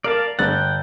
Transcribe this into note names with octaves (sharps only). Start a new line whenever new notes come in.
A#4 D5 F5 A5
G1 F#5 G5 A6